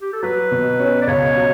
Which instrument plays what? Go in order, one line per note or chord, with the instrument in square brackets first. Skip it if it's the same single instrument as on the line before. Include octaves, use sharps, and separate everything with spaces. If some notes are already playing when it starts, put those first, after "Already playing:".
[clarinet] G4
A4
[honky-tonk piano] F#3 [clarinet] B4
[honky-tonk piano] B2
C#4
[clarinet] D5
[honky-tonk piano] C#2 [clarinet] C#5
[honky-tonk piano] F#3